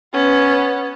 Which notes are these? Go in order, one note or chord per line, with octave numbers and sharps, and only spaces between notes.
B3 C#4